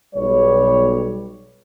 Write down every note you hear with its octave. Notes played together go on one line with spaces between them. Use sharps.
B1 G3 C#5